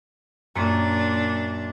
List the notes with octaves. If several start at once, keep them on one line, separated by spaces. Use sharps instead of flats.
F#2 A#2 D4